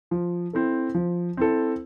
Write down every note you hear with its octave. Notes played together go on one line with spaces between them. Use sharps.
F3
C4 E4 A4
F3
C4 E4 A4